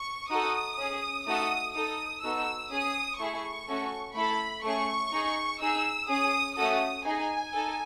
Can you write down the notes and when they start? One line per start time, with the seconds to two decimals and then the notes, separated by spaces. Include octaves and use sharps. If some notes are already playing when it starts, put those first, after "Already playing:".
Already playing: C#6
0.30 D#4 F#4 A4 D#6
0.78 C#4 G#4
1.26 A3 D#4 F#4 A4 D#6
1.74 D#4 A4 D#6
2.22 B3 D#4 F#4 A4 E6
2.70 C#4 G#4 D#6
3.19 A3 E4 G#4 C#6
3.68 A3 C#4 F#4 A4
4.15 A3 E4 A4 B5
4.63 A3 C#4 G#4 C#6
5.12 D#4 G#4
5.60 D#4 G#4 E6
6.08 C#4 G#4 D#6
6.56 A3 C#4 F#4 A4 D#6
7.05 D#4 G#4 G#5
7.53 D#4 A4